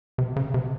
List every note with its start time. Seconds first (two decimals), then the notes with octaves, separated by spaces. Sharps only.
0.18 C3
0.36 C#3
0.54 C3